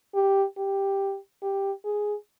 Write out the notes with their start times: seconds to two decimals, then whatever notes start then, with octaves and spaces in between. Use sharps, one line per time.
0.15 G4
0.58 G4
1.42 G4
1.85 G#4